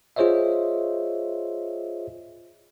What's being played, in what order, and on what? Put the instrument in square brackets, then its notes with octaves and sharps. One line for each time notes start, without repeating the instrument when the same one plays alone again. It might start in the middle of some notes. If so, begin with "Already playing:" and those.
[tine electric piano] F4 G#4 C5 C#5 D#5 E5